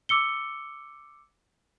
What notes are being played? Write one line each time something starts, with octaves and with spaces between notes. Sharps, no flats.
D6 E6 C#7 G7